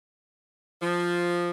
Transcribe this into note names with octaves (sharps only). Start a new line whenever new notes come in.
F3